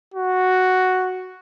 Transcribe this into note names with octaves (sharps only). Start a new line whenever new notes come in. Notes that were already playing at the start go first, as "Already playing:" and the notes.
F#4